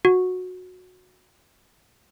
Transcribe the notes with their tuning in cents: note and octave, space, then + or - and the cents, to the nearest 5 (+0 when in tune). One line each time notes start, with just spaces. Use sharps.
F#4 -15